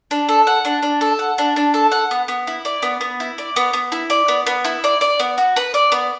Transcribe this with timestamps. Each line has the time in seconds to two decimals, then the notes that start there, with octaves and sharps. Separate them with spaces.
0.11 D4
0.29 A4
0.47 F#5
0.65 D4
0.83 D4
1.01 A4
1.19 F#5
1.38 D4
1.56 D4
1.74 A4
1.92 F#5
2.11 B3
2.28 B3
2.47 E4
2.65 D5
2.83 B3
3.01 B3
3.20 E4
3.38 D5
3.56 B3
3.73 B3
3.92 E4
4.10 D5
4.28 B3
4.47 B3
4.65 E4
4.84 D5
5.01 D5
5.20 B3
5.38 F#4
5.56 B4
5.74 D5
5.92 B3